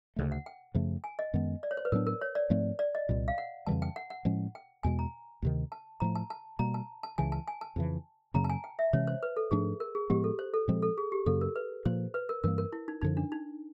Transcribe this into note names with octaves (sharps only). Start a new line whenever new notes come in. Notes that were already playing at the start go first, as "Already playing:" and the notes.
D2 C#3 E3 A3
F#5
G5
F#2 C#3 F3 A3
G#5
D#5
F#2 D#3 G#3 B3
D5
C#5
C5
B4
A2 F#3 B3 D4 A#4
A#4
C#5
D5
G#2 F3 A3 C4
D5
D#5
C2 A#2 G3
F5
F#5
F2 C#3 E3 G3 A5
G5
F#5
F#5
A2 F3 G#3 C#4
G5
E2 B2 G#3 G#5
A#5
D2 C3 D#3
A5
A2 F3 A3 A#5
A5
A5
B2 G3 A#3 A#5
A5
A5
C#2 C#3 E3 G#5
A5
G#5
A5
F2 C#3 E3
F#2 C#3 F#3 A#3 A#5
A5
G#5
G5
E5
C3 E3 G#3 C#4 C#5
C5
B4
A4
G#2 F3 A3 D4 G#4
A#4
G#4
A2 F3 G#3 B3 G4
A4
C5
A4
A#2 F3 G#3 C4
A4
G#4
G4
F#2 C#3 F#3 A#3 A4
A#4
B4
A#2 F3 A#3 C5
B4
A#4
G2 E3 G3 A#3 A#4
A#4
E4
D#4
F#2 D3 F3 D#4
D4
D#4